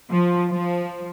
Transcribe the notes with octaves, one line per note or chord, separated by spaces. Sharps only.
F3
F3